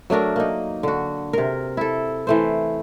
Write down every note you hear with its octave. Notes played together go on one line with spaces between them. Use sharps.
F#3 A3 D4 A#4
A#3 D#4
D3 F#4
C3 A#4
E4 A4
E3 A3 C5